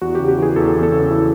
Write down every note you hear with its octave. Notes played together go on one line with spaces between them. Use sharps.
E2 F#4
G4
C#3
G4
E3 G#4
E2 A4
E2
A4
C#3
E3